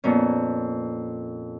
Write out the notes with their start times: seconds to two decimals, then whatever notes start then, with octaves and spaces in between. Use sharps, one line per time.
0.04 F2 A#2 B3 C#4